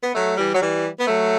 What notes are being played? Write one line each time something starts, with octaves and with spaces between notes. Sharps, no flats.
B3
F#3 A3
E3 G3
F#3
E3 G3
B3
F#3 A3